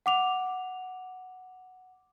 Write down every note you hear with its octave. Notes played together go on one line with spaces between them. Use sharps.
F#5 D6 F7